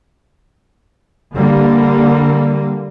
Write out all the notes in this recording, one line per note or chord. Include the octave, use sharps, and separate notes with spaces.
D3 G3 A#3